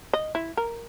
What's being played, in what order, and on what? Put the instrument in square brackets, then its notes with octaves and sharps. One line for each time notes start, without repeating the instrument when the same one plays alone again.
[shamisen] D#5
E4
A#4